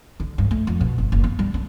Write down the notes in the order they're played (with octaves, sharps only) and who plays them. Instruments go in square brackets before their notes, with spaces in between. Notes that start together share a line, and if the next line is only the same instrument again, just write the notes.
[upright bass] D3
G2
A3
F2
B2
G1
F#1
B3
G3
D4